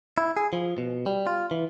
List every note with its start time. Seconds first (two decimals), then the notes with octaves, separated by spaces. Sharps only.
0.18 E4
0.37 G#4
0.53 F3
0.78 B2
1.06 G3
1.27 F4
1.51 E3